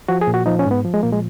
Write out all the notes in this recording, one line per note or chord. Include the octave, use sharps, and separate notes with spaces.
F3 F#4
G#4
A#2
F#4
F3 D#4
C#4
G#2
B3
F3
G#3
A#2 A#3
G#3